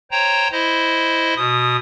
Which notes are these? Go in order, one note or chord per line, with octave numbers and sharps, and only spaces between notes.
C5 C#5 G5 A#5
E4 C5 D#5
B2 D#6